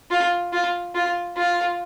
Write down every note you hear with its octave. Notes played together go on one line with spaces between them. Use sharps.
F4
F4
F4
F4